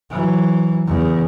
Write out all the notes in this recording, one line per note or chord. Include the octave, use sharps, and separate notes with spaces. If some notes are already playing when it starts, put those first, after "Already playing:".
E3 F#3
E2 C#3